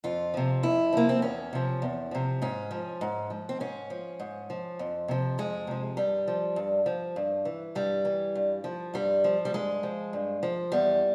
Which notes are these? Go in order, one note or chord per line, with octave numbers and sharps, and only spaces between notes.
F2 F4
C3 F3
F2 E4
C3 F3 A#3
C4
E2 C#4
C3 F3
E2
C3 F3
G#2 C#4
F3
G#2
F3
C4
G#2 C#4
F3
G#2
F3
F2
C3 F3
F2 G#3
C3 F3
G2 G3
F3
G2
F3
G2
E3
G2 G3
E3
G2
F3
G2 G3
F3
G3
G2 G#3
F3
G2
F3
E2 G3